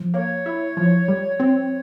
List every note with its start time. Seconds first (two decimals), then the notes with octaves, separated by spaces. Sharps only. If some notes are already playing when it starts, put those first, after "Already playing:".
Already playing: F3
0.14 A#3 C#5
0.46 E4
0.77 F3
1.08 G3
1.40 C4